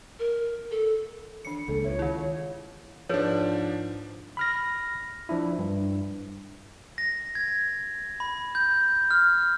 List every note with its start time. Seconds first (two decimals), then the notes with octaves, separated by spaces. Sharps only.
0.19 A#4
0.71 A4
1.45 D#3 E3 D4 C#7
1.68 C#2 C#3 G#3 A#3 A4
1.84 F4 B4 C#5 E5
1.99 D#3 E4
3.09 G#2 F3 D4 G#4 B4 C#5
4.37 B5 F6 A#6
5.29 F3 D4 E4
5.59 G2
6.98 A#6
7.35 G#6
8.20 B5
8.55 G6
9.11 F6